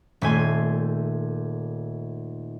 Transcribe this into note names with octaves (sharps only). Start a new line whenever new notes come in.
D#1 A3 G#5 C6